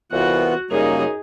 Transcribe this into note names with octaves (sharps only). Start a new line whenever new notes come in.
C2 E3 B3 F4 F#4 F#5
F#2 C#3 G3 A#3 D#4 G#4